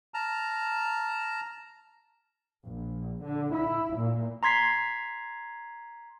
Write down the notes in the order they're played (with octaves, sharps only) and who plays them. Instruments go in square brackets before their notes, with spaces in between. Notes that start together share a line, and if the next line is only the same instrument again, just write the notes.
[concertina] A5 A#5 F6
[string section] A#1
D3
E4
A#2
[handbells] A#5 C6 G#6 B6 C7